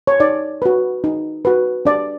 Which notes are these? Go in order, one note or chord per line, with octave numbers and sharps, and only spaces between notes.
C#5
D#4 D5
F#4 B4
D#4
F#4 B4
D4 D5